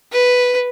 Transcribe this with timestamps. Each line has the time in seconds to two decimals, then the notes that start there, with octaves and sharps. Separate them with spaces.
0.12 B4